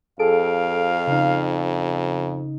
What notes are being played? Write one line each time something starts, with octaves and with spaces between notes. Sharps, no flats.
F2 G#4 A4 F5 D7
C#3 D#4